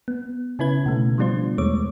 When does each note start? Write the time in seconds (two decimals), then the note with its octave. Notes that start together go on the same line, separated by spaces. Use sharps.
0.08 B3
0.59 C#3 C#4 E4 B4 G#6
0.86 B2 D3 A3
1.18 F3 G3 B3 D4 F4 C5
1.58 E2 G#3 A3 C#5 D6